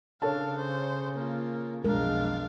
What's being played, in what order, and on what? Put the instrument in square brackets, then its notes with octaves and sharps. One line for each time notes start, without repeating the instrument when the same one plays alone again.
[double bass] C#3 [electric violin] D4 F5 [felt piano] A4 C#5 A5
[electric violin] C5
A#3 F4
[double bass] B1 F2 [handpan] G#3 A#4 [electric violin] D4 F5